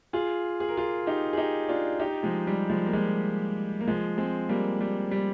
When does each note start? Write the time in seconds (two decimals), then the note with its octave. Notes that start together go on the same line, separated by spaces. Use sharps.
0.13 F4 G#4
0.60 G#4
0.69 A#4
0.77 F4 G#4
1.07 D#4 G4
1.33 G#4
1.37 D#4 G4
1.69 D4 F4
2.00 D#4 G4
2.23 F3 G#3
2.47 G3
2.70 F3 G#3
2.86 A#3
2.93 F3 G#3
3.81 A#3
3.88 F3 G#3
4.18 G#3 C4
4.49 G3 A#3
4.81 G3
5.11 G3